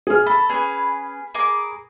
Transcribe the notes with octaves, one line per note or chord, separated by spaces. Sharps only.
G#4 F6
A4 B5
C#4 G#4 B4
G#4 A#4 D6